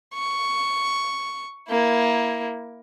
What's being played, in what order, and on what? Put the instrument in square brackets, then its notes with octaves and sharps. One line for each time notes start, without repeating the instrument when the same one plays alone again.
[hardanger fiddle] C#6
A#3 E4